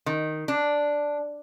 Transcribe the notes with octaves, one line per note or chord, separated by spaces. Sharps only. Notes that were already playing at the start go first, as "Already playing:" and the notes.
D#3
D4